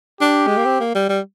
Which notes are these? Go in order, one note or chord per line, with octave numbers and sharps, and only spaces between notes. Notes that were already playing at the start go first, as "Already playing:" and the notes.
D4 G4
G#3
A#3
C4
A#3
G3
G3